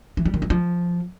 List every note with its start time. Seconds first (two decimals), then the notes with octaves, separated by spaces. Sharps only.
0.17 E3
0.25 G3
0.34 D#3
0.42 F#3
0.50 F3